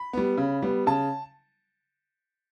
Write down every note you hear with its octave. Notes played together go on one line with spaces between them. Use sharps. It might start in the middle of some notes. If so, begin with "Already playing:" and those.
Already playing: B5
G3 B3
C#3
G3 B3
C#3 A5